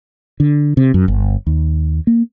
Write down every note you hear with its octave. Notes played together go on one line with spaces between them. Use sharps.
D3
C3
F#2
G1
D#2
A#3